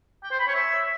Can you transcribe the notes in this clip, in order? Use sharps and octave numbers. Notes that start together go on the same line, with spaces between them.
G5
C5
B5
C#5
E5